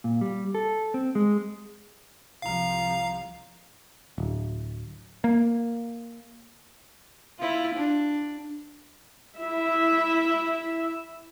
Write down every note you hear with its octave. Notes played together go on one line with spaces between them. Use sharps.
A#2
G3
A4
C4
G#3
C2 F3 F5 A#5
D1
A#3
E4 F4
D4
E4 E5